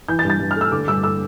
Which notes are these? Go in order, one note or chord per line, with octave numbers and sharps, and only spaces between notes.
E3 G6
A6
G2
A6
G2
F6
A3 E6
D3 D6
G2 E6
A3 E6